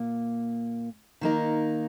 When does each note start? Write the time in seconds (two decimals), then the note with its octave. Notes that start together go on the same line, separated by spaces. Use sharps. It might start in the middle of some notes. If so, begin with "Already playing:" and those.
Already playing: A#2 A#3
1.21 D#3 A#3 D#4 A#4